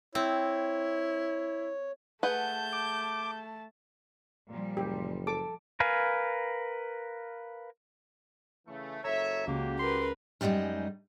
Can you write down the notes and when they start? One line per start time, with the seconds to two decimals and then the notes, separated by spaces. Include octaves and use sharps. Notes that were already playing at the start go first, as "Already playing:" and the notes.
0.15 C4 E4 C#5
2.23 A3 G#4 B4 F#5 A5 G6
2.73 D6
4.48 A#2 F3 G3
4.77 F#1 G4
5.27 A4 D6
5.80 A#4 B4 F5 G#5
8.68 C#3 E3 A3 C#6
9.04 F#1 A4 C#5 E5 A#5
9.47 C#2 A#3 F#4 G4
9.79 A#4 B4 C6
10.41 F#2 G3 G#3 B3 D#4